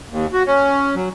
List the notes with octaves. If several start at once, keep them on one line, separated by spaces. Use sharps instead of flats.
D#2
F#4
C#4
F#3